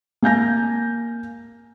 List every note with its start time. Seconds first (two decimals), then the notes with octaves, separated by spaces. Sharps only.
0.22 A#3 G#5 G6 A#6